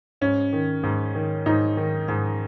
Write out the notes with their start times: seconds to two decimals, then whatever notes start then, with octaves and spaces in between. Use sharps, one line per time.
0.21 G#2 C#4
0.53 D#3
0.83 G#2
1.15 D#3
1.46 G#2 D#4
1.77 D#3
2.08 G#2